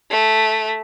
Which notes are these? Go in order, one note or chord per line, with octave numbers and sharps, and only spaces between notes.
A3